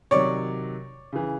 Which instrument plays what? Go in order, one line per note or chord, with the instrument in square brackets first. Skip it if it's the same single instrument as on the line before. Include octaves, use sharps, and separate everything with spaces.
[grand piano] C3 D#3 F#3 [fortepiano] C#5 D5
[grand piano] C#3 E3